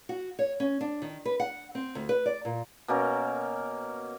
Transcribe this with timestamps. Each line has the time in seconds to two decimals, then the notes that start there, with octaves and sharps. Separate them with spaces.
0.09 F#4
0.39 C#5
0.60 C#4
0.81 D4
1.02 D#3
1.25 B4
1.40 F#5
1.75 C4
1.95 D2
2.09 B4
2.26 D5
2.45 A#2
2.88 B2 A#3 C#4 A#4